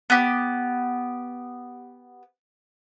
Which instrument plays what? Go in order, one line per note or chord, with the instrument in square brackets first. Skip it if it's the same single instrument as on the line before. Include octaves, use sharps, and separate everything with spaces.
[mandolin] B3 G4